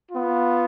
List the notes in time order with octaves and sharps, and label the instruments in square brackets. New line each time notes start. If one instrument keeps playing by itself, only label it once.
[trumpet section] B3 F4